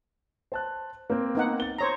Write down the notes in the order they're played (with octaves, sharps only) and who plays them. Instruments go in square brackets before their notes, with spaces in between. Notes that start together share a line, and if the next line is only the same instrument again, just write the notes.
[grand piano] C5 A5 F#6
A#3 C4
[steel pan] B3 D#4 F#5
[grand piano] A6 G7
[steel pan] C5 C#5 A#5